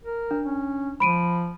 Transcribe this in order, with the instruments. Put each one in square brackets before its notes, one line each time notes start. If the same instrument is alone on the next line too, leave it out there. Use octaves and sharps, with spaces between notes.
[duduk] A#4
[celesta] D4
[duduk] C#4
[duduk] F3 [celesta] B5 D7 D#7